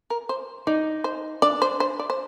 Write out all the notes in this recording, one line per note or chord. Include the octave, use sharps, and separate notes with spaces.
A#4
C5
D#4 D5
C5
D4 D5
C5
C5
D5
C5